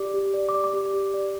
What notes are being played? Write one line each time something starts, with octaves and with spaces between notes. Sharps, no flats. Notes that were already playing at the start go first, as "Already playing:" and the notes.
Already playing: G4 D5 D6
G4
D5
D6
D5
D6
G4
G4
D5